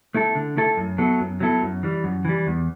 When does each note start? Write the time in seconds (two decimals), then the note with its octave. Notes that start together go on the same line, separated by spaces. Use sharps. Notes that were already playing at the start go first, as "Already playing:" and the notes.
0.15 A3 E4 A4
0.35 D3
0.57 A3 E4 A4
0.77 F#2
0.98 F#3 B3 E4 A4
1.19 F#2
1.40 F#3 B3 E4 A4
1.62 F#2
1.83 E3 G3
2.04 F#2
2.25 E3 G3
2.47 E2